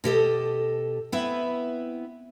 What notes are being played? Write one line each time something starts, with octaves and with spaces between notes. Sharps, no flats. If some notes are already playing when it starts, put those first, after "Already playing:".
B2 G4 A4 D#5
B3 C4 E4 B4 E5